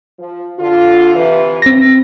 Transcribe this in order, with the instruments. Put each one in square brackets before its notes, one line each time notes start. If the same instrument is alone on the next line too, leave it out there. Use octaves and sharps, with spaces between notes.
[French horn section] F3
D3 F4
C3 E3
[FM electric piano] C4 A#6